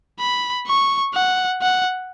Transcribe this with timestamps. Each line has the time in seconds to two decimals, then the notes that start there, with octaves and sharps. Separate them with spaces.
0.20 B5
0.67 C#6
1.14 F#5
1.62 F#5